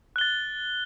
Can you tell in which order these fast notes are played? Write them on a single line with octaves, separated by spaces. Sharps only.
F#6 G7 A6